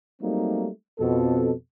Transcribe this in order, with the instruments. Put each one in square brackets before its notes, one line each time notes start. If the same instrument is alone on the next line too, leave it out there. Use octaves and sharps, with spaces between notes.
[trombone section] F#3 G3 A3 A#3 C4 D#4
F2 B2 A4